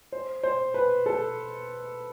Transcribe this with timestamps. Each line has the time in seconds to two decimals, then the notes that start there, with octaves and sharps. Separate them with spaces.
0.12 C5
0.43 C5
0.74 B4
1.06 A4